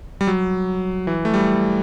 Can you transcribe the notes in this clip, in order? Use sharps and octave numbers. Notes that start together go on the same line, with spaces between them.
G3
F#3
E3
A3
G3